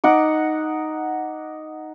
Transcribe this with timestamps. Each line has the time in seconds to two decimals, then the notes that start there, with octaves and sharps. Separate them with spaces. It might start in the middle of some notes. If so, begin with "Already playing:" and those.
0.04 D#4 F#5 D6